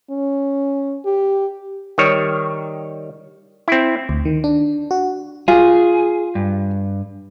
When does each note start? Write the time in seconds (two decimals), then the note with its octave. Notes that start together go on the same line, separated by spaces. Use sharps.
0.11 C#4
1.05 G4
1.98 D#3 G3 C#5
3.68 C4 E4
4.09 D2
4.25 D#3
4.44 D4
4.91 F#4
5.48 F4 G#4
6.35 G2